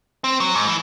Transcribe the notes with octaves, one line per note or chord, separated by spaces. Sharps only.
C4
F#3
G#2
E3